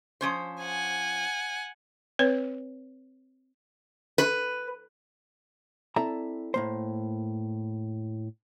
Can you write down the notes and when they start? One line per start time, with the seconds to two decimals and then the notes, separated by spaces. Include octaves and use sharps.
0.21 F3 C#4 C5
0.62 F#5 G#5
2.19 C4 B4 C#5
4.18 B4
5.96 C4 E4 A4 D5 E5 A#5
6.54 A2 A#3 C5